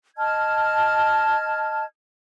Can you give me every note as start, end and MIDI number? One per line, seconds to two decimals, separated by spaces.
0.16 1.84 75
0.16 1.84 81
0.16 1.84 89
0.16 1.84 92